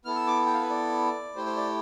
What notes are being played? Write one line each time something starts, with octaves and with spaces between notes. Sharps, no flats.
B3 E4 A4 F6
E6
D6
G5
F5
B4
D5
A3 E4 G4 C5
C5
D5